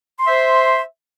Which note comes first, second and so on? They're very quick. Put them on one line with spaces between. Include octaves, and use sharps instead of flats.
C6 E5 C5